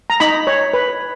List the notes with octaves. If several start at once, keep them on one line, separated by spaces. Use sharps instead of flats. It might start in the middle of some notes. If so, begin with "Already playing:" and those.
A#5
D#4 B5
C#5
B4